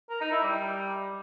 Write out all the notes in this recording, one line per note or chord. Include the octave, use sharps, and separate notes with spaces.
A#4
D#4
E4
G3